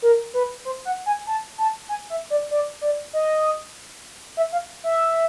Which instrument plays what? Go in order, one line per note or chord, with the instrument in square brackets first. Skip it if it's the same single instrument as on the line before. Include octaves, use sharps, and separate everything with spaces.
[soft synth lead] A#4
B4
C5
F#5
G#5
A5
A5
G#5
E5
D5
D5
D5
D#5
E5
F5
E5